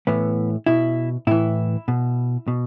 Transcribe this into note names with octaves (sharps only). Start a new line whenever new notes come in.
A2 E3 B3
B2 E4
A2 E3 E4
B2
B2